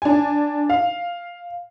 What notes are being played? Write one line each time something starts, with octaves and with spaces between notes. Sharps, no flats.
D4 G#5
F5